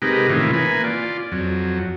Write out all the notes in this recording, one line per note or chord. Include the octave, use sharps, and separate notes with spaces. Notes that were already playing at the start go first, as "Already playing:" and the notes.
C3 G#3 D#4 G4 A#4 B4
A2 C3 D#3 E3 C#4 F4
A#3 B4 G#5
F4 D5
F2 F#3